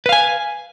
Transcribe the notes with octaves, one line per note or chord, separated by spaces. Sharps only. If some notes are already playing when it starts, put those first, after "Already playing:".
B4 F5 G#5